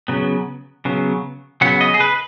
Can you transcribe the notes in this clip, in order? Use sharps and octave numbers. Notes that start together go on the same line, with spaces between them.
C#3 F#3 B3
C#3 F#3 B3
C#3 F#3 B3 F#5
D#5
G#4
B4